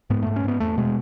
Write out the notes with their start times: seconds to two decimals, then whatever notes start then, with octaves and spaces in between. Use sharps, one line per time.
0.10 G#2 B3
0.22 G#2 A3
0.36 C#4
0.44 G#2 B3
0.60 E2 A3
0.78 B2 G#3